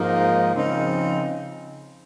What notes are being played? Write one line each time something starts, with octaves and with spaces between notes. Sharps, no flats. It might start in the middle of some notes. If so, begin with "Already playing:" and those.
Already playing: G#2 F3 A#3 D#4
C#3 F3 C4 D#4